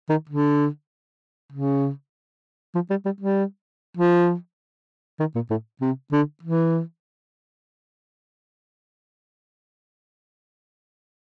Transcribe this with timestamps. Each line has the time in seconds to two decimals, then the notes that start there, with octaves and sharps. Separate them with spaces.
0.09 D#3
0.29 D3
1.52 C#3
2.75 F3
2.90 G3
3.05 G3
3.21 G3
3.97 F3
5.20 D#3
5.35 A#2
5.50 A2
5.81 C3
6.12 D3
6.43 E3